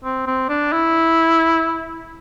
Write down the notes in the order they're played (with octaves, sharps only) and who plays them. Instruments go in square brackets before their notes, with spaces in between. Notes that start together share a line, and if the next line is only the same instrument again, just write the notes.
[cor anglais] C4
C4
D4
E4